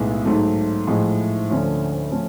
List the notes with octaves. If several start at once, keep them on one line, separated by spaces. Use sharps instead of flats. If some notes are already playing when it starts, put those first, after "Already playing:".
Already playing: B1 A2 G#3 B3
G#2 F#3 A3
A2 F3 G#3
D2 D3 F3 A3 C#4
F3 A3 C#4